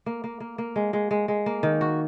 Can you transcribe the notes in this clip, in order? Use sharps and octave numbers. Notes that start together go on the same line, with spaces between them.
A#3
A#3
A#3
A#3
G#3
G#3
G#3
G#3
A#3
D#3
F#4